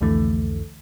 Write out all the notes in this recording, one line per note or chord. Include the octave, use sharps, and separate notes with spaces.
C2 F2 D3 E3 A3